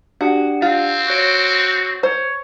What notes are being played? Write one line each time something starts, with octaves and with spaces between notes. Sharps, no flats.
D4 F#4 G4 F#5
C4 F4
F#4 C#5 D7
C5 C#5